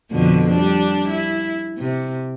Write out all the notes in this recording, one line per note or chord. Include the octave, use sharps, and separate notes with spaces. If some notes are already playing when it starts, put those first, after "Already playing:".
F2 B2 D3
G3 D4
E4
C3